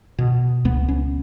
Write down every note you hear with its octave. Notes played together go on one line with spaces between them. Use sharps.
B2
C#2 B3
C#4